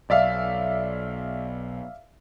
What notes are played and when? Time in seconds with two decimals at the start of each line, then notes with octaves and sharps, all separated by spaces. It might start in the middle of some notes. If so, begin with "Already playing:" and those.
0.10 B1 D5 E5 F5